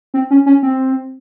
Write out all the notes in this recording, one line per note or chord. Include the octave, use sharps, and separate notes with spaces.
C4
C#4
C#4
C4